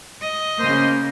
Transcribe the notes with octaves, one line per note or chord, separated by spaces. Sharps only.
D#5
C#3 A#3 C5